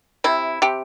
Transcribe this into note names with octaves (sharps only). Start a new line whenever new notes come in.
C3 E4
C3 G4